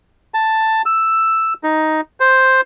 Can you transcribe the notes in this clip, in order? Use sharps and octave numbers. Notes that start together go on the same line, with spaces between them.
A5
E6
D#4
C5